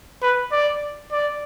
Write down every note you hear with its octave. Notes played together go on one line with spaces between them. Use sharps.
B4
D5
D5